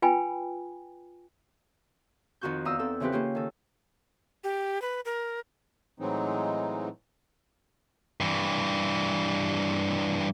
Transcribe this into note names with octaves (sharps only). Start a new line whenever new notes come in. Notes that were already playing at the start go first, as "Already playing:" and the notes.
F4 B4 G5 G#5 B5
F2 D#3 F3 F#4 C#6 G6
E2 F5 A#5 D#6 E6
C4 A4 E6
C#3 E3 F3 C4 G4 B4
A#3 C#4 F4 G4
D#3 A4
G4
B4
A#4
A2 E3 F#3 G#3 C4 D#4
G2 E3